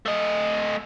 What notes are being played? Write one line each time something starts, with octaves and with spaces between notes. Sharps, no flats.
A3 D#5